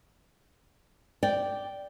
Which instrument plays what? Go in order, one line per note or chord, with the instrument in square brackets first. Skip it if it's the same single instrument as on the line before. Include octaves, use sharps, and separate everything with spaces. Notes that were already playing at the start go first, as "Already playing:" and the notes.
[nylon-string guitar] D5 G5